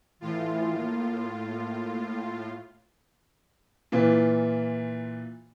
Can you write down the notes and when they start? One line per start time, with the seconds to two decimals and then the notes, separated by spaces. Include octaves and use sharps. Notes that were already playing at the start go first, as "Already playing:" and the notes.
0.21 A2 E3 F4
0.76 A#3
1.41 A#3
3.92 A#2 E3 F4